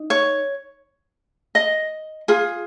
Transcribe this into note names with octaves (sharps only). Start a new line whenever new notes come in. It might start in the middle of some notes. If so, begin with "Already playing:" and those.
Already playing: D#4
C#5
D#5
F4 G#4